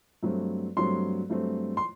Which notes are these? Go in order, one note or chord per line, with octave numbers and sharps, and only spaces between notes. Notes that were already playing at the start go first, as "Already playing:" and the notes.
G2 F#3 A3 C4
G2 F#3 A3 C4 C6
G2 F#3 A3 C4
C6